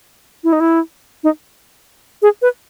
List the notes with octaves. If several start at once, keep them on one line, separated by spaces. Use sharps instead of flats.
E4
D#4
E4
D#4
G#4
B4